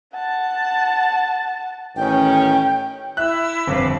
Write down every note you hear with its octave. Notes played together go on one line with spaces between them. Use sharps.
F#5 A5
A1 D#3 C#4 G5
E4 E5 E6 F#6
G1 F2 B4 F5 D6